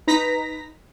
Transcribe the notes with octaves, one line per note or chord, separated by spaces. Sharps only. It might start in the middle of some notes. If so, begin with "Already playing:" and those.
D#4 B4 A#5 A#6 B6